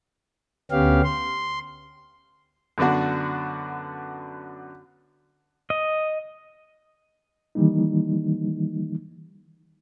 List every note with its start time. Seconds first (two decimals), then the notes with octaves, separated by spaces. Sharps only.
0.71 D2 B3 C#4 G4 F5
1.04 C6
2.78 F#2 D3 B3 D4 F#4
5.70 D#5
7.55 D#3 E3 G3 A#3 D#4